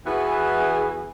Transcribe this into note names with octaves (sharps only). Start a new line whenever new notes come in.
E2 E3 B3 F#4 G#4 E5